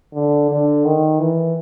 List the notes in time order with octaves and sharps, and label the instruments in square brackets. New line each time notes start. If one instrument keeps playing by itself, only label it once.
[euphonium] D3
D3
D#3
E3